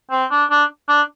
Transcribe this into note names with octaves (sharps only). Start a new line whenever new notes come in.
C4
D4
D4
D4